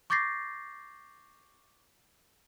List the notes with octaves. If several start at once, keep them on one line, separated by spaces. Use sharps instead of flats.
C#6 D6 G6 A6 A#6 C7